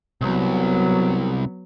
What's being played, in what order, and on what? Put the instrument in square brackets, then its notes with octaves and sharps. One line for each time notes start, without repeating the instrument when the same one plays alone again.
[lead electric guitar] C2 [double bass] F#3 B3